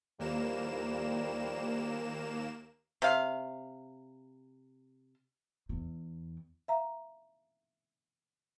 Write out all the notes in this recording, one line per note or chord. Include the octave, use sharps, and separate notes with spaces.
D#2 A2 F3 G3 A#3 E7
C3 F5
E2
E5 F5 A#5